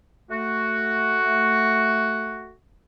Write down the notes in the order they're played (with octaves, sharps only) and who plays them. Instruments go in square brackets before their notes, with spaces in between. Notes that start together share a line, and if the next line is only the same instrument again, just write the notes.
[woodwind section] A3 F#4